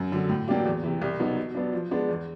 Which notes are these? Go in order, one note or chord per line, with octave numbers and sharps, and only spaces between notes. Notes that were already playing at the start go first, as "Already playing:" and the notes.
Already playing: F#2
D3 F#3
A2
F#3 A#3 D4 G4
E2
C3 E3
C2
B2 F#3 B3 D#4
B2
F#3 B3 D4
F3
G#3 B3 D4
E2